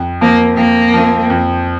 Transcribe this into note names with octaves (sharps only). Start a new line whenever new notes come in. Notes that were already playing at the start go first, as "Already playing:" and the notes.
Already playing: F2
F3 A#3 C4
F2 A#3
F3 C4
F2